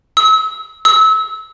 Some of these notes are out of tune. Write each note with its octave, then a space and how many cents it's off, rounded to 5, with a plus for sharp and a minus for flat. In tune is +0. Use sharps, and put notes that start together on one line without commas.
E6 -35
E6 -30